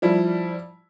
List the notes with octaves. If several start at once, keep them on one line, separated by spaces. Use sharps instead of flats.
F3 G3 E4